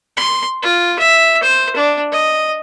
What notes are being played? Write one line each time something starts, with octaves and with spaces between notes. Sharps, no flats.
C6
F4
E5
C5
D4
D#5